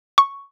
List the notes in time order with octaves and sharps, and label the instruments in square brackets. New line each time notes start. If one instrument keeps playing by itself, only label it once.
[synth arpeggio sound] C#6